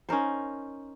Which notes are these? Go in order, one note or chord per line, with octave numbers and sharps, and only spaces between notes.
C#4 D#4 A#4 C5